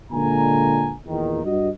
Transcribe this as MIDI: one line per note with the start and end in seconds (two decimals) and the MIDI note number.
0.11 0.93 46
0.11 0.93 50
0.11 0.93 56
0.11 0.93 58
0.11 0.93 80
0.11 0.93 82
1.06 1.41 40
1.06 1.41 46
1.06 1.41 51
1.44 1.69 43
1.44 1.69 66
1.44 1.69 75